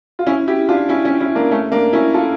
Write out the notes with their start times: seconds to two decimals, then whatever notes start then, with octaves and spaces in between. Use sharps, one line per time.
0.19 F4
0.26 C#4 E4
0.47 E4 G4
0.69 D4 F4
0.89 C#4 E4
1.04 C#4 E4
1.20 C#4 E4
1.35 A#3 D4
1.51 A3 C#4
1.72 A#3 D4
1.93 C#4 E4
2.14 F4 A4